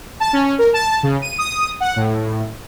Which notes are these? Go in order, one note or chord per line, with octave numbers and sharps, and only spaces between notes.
A5
C#4
A#4
A5
C#3
D#7
D#6
F#5
A2